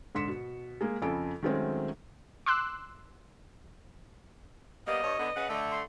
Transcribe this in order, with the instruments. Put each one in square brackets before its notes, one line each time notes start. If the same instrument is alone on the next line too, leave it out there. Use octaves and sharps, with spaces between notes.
[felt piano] G#2 D3 C6 B6 C#7 E7
B2
G#3 A#3 G#4
F2 C#3 F4 A4 G#5 D7
D#3 F#3 G#3 A3 C4 C#4
[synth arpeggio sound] C6 D6 E6 F#6
[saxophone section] G3 A#3 B3 [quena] D#5
[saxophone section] G2 C#5
D3 B3
C#3 B4 F#5
D3 A3
[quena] C6